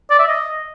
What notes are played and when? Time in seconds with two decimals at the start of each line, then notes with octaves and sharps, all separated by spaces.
0.10 D5
0.19 E5
0.28 D#5